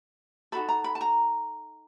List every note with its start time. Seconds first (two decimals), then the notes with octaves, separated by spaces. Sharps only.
0.52 D#4 F#4 A4 B5
0.69 A#5
0.84 B5
0.95 A5
1.01 A#5